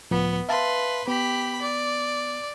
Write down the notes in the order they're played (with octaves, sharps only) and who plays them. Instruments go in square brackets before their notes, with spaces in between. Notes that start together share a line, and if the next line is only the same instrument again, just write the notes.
[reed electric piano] C#2 A2 F3 [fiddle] B3
[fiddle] B4 C6 [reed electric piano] E5 F5 A5
[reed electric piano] B3 [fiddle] G4 B5
[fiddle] D5